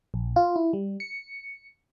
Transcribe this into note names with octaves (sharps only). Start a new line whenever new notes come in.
A#1
F4
E4
G3
C#7